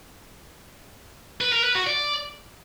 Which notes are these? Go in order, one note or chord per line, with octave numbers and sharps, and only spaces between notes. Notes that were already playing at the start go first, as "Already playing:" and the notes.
B4
A#4
B4
F#4
D5